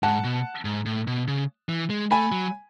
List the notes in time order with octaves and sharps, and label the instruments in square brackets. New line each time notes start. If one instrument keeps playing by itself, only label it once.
[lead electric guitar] G#2 [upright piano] F#5 A5
[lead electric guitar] B2
G#2
A2
B2
C#3
E3
G#3
[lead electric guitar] A3 [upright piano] G#5 B5
[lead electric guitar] F#3